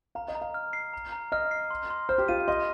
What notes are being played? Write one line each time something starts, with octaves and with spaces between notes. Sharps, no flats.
F5 A#5
D#5
A#5
F5
F6
C7
A#5
A#5
D#5 F6
C7
C6
C6
C5 F6
G4
F4 D#7
D#5 C6